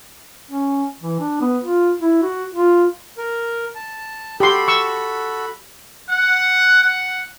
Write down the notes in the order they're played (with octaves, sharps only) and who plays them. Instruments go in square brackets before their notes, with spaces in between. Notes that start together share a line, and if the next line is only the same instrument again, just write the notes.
[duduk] C#4
E3
D4
B3
F4
E4
F#4
F4
[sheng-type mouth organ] A#4
A5
[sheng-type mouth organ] F#4 A4 B5 [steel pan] G4 C6
[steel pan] C#6 E6
[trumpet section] F#5
F#5